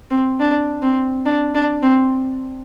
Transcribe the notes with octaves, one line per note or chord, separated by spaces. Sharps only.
C4
D4
C4
D4
D4
C4